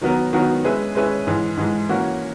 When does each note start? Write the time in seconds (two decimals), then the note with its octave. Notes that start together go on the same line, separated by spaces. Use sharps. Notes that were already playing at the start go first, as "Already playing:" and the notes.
0.01 D#3 F#3 B3 F#4 A#4
0.33 D#3 F#3 B3 F#4 A#4
0.64 G#3 C#4 G#4 B4 E5
0.95 G#3 C#4 G#4 B4 E5
1.27 G#2 E3 G#3
1.57 G#2 E3 G#3
1.89 E3 A#3 C#4 F#4